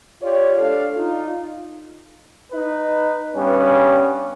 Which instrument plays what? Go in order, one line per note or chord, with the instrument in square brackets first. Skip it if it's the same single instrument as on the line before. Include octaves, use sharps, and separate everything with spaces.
[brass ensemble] F4 G4 C#5 D5
A3 D4 A4 F5
D#4 F4
[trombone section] D#4 B4
G2 G3 B3 C#4